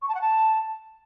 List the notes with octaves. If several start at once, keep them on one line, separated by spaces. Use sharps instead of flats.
C#6
A5
F#5
A5